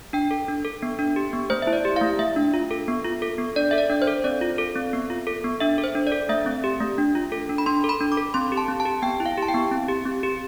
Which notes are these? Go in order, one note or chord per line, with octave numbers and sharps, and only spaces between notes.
D4 G5
A4
D4
A4
B3
D4
G4
B3
A3 C5
E4 E5
D5
G4
A3 F5
A3 E5
D4
F4
A4
B3
F4
A4
B3
D4 D5
A4 E5
D5
D4
C5
A4
C4 D5
F4
A4
C4
B3
F4
A4
B3
D4 E5
A4
C5
D4
D5
A4
A3 E5
C4
G4
A3
D4
F4
A4
D4
B5
D4 C6
A4
B5
D4
D6
A4
C4 C6
G4
A5
C4
A5
G4
B3 G5
E4
F5
G4 A5
G5
B3
C4
G4
C4
G4